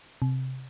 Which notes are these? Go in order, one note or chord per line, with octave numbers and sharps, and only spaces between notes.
C3